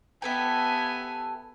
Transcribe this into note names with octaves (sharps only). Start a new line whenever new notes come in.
B3 G4 A4 E5 G#5